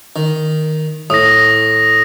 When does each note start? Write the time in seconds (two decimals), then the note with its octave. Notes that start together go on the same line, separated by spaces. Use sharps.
0.16 D#3
1.10 A2 D#6 A#6